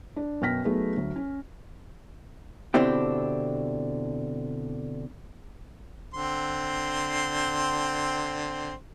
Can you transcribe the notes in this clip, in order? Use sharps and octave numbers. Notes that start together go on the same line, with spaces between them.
D4
F#2 B2 G5 F6 A#6 B6
F#3 A3 B3 D#4 G#4
D2 F#3
C#4
B2 D3 C4 D4 E4 G4
D3 C4 C6